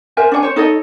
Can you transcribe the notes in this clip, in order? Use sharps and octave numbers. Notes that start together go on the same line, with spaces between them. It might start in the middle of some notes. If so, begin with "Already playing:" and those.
A#4 C5 E5 G#5
D4 C#5 G#5
C5 C#5
D#4 A4 C#5 D#5